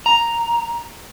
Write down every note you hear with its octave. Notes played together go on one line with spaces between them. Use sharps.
A#5